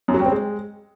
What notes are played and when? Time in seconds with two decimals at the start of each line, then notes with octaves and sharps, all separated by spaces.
0.08 F#2
0.14 F#3
0.20 G3
0.26 C4
0.32 G#3